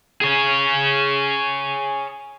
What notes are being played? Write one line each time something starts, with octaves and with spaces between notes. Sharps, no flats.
G#4 C#5